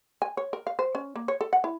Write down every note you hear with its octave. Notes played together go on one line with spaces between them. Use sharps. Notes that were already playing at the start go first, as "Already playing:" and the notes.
G#5
C#5
A#4
F5
C5
C#4
A#3
C#5
A4
F#5
E4